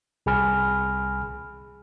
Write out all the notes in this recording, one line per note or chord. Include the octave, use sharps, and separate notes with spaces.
C2 G#4 G#5 B5 F6